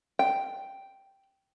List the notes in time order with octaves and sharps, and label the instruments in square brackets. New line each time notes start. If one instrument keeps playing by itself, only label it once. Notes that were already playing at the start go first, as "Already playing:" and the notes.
[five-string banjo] G5